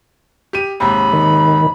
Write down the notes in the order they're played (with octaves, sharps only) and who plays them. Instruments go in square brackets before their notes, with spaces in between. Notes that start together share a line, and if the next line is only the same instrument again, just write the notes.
[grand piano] G4 D#7
[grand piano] D#2 G#2 C3 [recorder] B5
[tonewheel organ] D#3